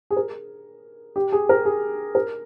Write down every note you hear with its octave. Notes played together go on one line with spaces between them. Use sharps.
G#4
A#4
G4
G#4
A#4
G#4
A#4